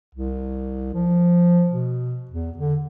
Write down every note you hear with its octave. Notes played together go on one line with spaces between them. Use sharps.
C2
F3
B2
E2
D3